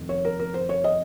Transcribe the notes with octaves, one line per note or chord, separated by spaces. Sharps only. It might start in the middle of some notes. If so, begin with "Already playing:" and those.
Already playing: F1 D#3
C#5
A#4
A#4
C5
C#5
D#5